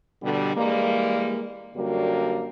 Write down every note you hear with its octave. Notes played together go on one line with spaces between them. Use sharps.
B2 D3 G3
E3 G3 G#3 A#3
F#2 D3 G3 A#3 F#4